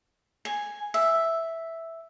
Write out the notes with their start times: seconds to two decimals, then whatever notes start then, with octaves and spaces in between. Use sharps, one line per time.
0.45 G#5
0.94 E5